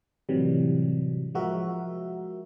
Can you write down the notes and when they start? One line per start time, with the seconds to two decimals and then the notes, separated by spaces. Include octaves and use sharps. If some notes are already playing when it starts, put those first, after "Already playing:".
0.29 A2 C3 E3 F#3 G3
1.35 F3 G#3 F#4 A#4 E5